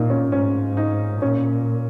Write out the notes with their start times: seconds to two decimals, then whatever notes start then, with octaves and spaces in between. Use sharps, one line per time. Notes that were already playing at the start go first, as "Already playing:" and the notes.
Already playing: A#2 D#4 F4
0.10 C#4
0.32 G#2 C#4
0.77 D#4
1.21 A#2 C#4